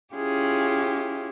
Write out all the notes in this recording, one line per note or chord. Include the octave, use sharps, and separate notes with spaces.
C#4 E4 F4 G4 G#4